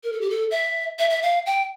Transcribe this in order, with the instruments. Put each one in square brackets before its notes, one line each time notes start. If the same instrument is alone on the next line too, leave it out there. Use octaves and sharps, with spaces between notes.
[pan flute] A#4
A4
G4
A4
E5
E5
E5
F5
G5